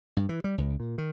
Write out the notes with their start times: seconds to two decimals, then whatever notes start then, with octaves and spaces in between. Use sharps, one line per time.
0.17 G2
0.29 E3
0.44 G3
0.58 C#2
0.80 A#2
0.98 D#3